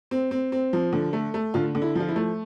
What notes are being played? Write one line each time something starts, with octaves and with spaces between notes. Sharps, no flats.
C4
C4
C4
F3
D3
A3
A3
D3 F4
D3
E4
F3 F4
E4
A3